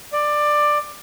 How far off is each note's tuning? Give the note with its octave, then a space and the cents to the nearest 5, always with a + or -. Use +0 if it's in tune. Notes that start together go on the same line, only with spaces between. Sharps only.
D5 +15